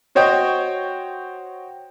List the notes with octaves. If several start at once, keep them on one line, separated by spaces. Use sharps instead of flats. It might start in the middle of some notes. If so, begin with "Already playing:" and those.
F#4 C5 C#5 D#5 G5